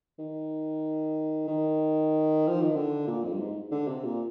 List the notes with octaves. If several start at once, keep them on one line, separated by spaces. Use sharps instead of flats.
D#3
D#3
F3
D#3
D3
A#2
F2
G2
G#2
D3
C3
A#2